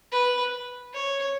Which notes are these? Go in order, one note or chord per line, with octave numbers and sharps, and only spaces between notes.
B4
C#5